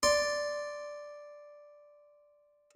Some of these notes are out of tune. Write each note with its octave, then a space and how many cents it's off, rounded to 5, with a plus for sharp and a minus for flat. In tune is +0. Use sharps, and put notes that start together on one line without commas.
D5 +0 C6 +0